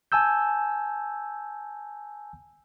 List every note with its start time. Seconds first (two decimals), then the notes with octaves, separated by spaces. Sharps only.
0.12 G#5 A5 E6 G6